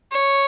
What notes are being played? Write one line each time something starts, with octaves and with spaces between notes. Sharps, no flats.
C#5